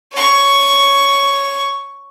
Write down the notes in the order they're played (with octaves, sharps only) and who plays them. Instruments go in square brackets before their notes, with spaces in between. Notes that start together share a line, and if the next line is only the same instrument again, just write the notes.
[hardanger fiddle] C#5 C#6